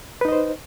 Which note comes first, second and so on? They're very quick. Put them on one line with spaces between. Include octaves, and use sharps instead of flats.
B4 D#4 D#5 C5